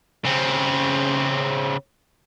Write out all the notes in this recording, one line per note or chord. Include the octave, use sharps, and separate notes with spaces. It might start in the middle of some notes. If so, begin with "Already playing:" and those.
C#3 C4